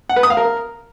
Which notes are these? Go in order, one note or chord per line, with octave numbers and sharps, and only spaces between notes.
F#5
B4
D#6
F5
A#4